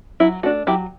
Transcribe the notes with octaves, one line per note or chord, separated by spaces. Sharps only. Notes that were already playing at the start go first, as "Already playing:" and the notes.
F#3 E4
A3 D4 F#4
F#3 E4 G4